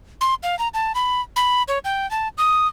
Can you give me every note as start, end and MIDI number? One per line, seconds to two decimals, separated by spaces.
0.21 0.34 84
0.43 0.58 77
0.59 0.68 82
0.74 0.92 81
0.95 1.21 83
1.36 1.63 83
1.68 1.79 73
1.85 2.09 79
2.11 2.28 81
2.38 2.67 87